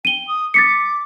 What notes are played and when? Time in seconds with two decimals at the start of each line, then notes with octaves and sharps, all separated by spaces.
0.05 G5 D#7 G7
0.27 D#6
0.54 D6 A6 B6 C#7